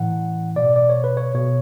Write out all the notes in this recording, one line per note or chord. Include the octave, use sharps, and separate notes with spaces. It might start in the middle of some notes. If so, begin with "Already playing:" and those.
Already playing: A2 E3 F#5
B2 D5
D5
C#5
B4
C#5
B2 C#5